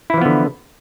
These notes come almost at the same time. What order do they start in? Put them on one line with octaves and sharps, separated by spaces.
E4 E3 F3 B3 D3